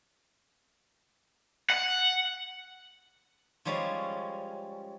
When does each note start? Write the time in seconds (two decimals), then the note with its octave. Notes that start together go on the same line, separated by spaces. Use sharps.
1.70 F#5
3.65 F3 G3 G#3 C#4